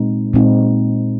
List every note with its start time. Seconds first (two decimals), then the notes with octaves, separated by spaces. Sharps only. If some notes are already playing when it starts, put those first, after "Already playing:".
Already playing: A#2 G#3 C4 D#4
0.33 A#2 G#3 C4 D#4